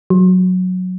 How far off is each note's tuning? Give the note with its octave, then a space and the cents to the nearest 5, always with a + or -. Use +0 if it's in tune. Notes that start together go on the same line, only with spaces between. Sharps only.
F#3 -10